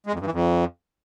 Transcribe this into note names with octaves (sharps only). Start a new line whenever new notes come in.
G#3
F2
G2
E3
F2